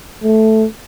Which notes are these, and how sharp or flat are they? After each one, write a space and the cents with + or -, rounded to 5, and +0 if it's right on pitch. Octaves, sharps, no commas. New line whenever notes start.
A3 -5